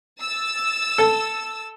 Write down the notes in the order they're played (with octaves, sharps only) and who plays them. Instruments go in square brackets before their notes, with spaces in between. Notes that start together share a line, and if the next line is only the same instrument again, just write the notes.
[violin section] E6 A6
[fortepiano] A4